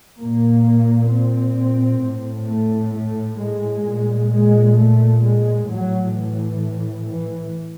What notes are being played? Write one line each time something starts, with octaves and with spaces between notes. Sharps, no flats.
A#2 A#3
C4
A2
A3
A3
G#3
A#2
G#3
A3
G#3
A2 F#3
E3
E3